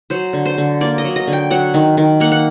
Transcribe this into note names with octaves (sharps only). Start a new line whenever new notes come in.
F#3 C5
D3
C5
D3
A#3 D5
D#5
F#3
D#5
D3
G5
F#3 F#5
D#3
D#3
A#3 F#5
F#5